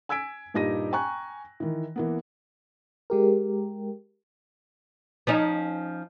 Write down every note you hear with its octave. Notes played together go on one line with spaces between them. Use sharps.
G#5 E6 G#6 B6 D7
G2 A#2 D#4 G4 A#6 D#7
G5 G#5 A#5 C#6 F#6
D#3 E3
E3 A#3 B3
G#3 G4 A#4
F3 C#4 D#4